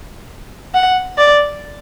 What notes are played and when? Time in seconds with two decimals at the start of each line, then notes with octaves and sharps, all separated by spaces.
0.74 F#5
1.18 D5